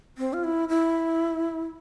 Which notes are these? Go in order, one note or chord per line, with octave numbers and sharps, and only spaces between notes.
C4
F4
E4
E4